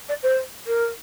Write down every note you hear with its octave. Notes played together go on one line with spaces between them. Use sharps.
D5
C5
A#4